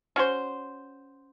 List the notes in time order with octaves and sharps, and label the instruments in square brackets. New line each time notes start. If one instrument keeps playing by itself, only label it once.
[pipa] C#4 F#4 C5